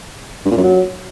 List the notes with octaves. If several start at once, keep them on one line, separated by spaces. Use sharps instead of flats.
G2
A#2
F#2
F#3